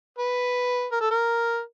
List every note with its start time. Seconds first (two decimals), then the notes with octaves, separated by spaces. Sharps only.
0.19 B4
0.92 A#4
1.01 A4
1.11 A#4